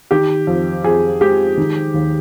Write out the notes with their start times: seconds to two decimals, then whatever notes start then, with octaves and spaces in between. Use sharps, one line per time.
0.11 D#3 G4
0.47 F2
0.84 F2 G#4
1.21 G#3 G4
1.58 D#3
1.94 D#2